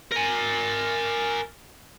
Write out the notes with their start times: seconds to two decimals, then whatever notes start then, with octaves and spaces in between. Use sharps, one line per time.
0.12 A#4 G#5